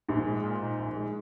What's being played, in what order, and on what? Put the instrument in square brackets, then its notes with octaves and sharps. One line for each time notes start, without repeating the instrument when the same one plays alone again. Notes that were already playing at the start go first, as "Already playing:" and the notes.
[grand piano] A#1 [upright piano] G#2
[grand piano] G#3
A#2
D#4
A#1
G#3